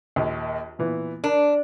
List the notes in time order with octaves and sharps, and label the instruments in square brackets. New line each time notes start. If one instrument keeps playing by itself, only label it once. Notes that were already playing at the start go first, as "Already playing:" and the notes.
[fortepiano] A#1 D#2
A#2 E3 B3
[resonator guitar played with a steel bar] D4 [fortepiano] A#4